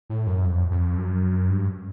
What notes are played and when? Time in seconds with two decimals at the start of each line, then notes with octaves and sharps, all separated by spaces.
0.10 A2
0.27 F#2
0.45 F2
0.71 F2
0.97 F#2
1.50 G2